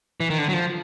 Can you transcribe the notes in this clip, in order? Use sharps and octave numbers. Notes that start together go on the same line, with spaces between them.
E3
D#3
D3
F#3
F3